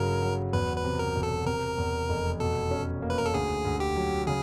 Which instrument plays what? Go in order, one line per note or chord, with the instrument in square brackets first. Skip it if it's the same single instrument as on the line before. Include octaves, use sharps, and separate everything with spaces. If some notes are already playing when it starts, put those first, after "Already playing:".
Already playing: [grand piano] G1 C#3 F#3 [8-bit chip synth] A#4
[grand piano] F#3
[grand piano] E2 [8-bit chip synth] B4
[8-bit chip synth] B4
[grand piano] C3
[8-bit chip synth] A#4
[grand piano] E1
[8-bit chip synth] A4
[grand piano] C3 [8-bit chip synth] A#4
[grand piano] E2
F1
[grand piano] B2 [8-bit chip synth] A4
[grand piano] C#4
A#3
[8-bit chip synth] B4
A#4
A4
[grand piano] D2 [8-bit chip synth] G#4
[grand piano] D2
[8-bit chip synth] G4
[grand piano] F#3
[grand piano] C#3 [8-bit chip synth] G#4